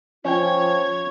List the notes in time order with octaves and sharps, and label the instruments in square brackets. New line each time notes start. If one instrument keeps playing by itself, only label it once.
[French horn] F3 [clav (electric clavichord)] C#4 G5 [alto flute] F4 [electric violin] C#5 G#6